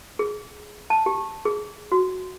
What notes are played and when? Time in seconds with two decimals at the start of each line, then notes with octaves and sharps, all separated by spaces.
0.19 G#4
0.90 A5
1.06 G4
1.45 G#4
1.92 F#4